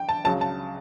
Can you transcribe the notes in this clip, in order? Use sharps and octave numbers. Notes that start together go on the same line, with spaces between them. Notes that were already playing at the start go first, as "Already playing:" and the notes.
Already playing: G5
A5
C#2 C#3 F#3 A5
A5